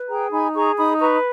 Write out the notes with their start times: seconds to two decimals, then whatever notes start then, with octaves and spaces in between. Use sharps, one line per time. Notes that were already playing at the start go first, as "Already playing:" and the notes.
Already playing: B4
0.09 G#4 G5 A#5
0.32 D#4 G#5 B5
0.55 G#4 A#5 C#6
0.77 D#4 B5 D#6
1.00 B4 A#5 C#6